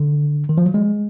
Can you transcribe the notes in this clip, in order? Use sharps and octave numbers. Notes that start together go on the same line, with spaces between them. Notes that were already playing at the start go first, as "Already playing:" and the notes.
Already playing: D3
D#3
F3
F#3
G#3